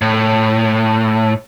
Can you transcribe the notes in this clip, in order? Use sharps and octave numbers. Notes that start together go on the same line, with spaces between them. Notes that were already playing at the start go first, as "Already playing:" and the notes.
A2